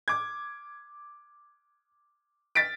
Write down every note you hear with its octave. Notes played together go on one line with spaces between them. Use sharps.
D6 G#6
A6 B6 D7